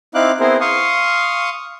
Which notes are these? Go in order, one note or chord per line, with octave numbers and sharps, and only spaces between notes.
C4 D#4 E4 F5 D6 F#6
B3 C4 E4 G#4 A#4 C5
F5 C6 C#6 D#6